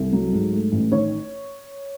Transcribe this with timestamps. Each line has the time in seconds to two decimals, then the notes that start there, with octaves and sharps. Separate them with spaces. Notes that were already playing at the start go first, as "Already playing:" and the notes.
Already playing: C2 A4
0.13 F#3
0.33 G#2
0.53 A3
0.72 A1
0.92 D#3 C#5